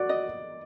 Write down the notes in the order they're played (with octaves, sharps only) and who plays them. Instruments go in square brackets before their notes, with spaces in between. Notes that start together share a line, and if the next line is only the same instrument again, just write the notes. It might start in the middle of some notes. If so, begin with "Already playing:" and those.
Already playing: [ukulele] F#4 [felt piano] D5
[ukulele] D#5